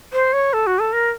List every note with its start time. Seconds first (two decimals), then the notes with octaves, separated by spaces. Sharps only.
0.13 C5
0.33 C#5
0.53 A4
0.67 F#4
0.79 A4
0.93 A#4